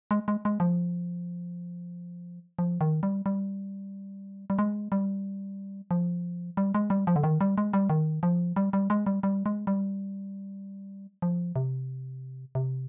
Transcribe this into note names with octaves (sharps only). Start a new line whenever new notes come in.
G#3
G#3
G#3
F3
F3
D#3
G3
G3
G3
G#3
G3
F3
G3
G#3
G3
F3
D3
D#3
G3
G#3
G3
D#3
F3
G3
G3
G#3
G3
G3
G#3
G3
F3
C3
C3